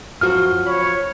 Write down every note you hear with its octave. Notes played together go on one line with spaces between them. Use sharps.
F#2 F3 F4 F#4 C5 F6
C#5 B5